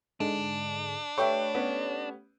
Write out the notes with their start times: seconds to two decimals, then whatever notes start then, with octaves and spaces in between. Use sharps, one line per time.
0.20 G#2 D3 G#3 D4
1.18 A3 G4 B4 C#5 E5 G5 C#6
1.55 B3 C#4